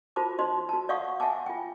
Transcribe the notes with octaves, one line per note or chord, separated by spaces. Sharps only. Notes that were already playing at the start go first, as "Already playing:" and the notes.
F4 F#4 C5 A5 D6
D#4 F#4 C5 D#5 C6
F#4 A5
D5 D#5 F5 F#5 C#6 D#6
E5 F#5 G#5 A5 D6
F4 G5